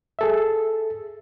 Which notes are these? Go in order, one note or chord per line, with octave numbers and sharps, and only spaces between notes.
G#4 A4 E5